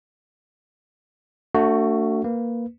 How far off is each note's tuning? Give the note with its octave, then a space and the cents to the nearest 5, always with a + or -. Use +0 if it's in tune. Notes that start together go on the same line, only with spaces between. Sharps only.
A3 +30 D4 -20 F#4 +0
A#3 +0 B4 +0